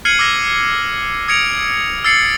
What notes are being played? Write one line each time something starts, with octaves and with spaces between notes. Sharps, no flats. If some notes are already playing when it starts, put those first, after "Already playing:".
F6 G#6 C7 C#7 D#7 F#7
D6 E6 G#6 A#6
D#6 G#6 A#6 C#7 D7 F7
E6 A6 C7 C#7 F#7